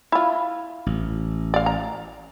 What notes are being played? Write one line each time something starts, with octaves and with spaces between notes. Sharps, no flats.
E4 F4
A1
D5 F5
A#5